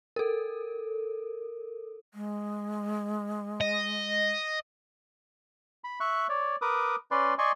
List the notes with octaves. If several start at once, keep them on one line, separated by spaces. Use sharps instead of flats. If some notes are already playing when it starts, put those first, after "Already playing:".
A4 A#4
G#3
D#5
B5
E5 C#6 F#6
C#5 D5
A#4 B4 D6 D#6
C#4 B4 D5 C6
D5 D#5 G#5 C6 C#6